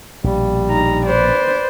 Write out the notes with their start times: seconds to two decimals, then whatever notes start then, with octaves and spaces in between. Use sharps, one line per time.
0.24 A#1 B2 G3
0.69 D#4 A#5
1.06 B4 C5 D5